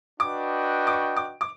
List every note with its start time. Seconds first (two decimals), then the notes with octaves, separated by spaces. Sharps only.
0.20 D4 F#4 B4 D#5 G5 D6
0.87 D6
0.93 C#6
1.17 D6
1.41 D6